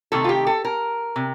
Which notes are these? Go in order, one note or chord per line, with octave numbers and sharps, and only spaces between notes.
C3 D#3 A3 A4
F4
G4
A4
A#4
C3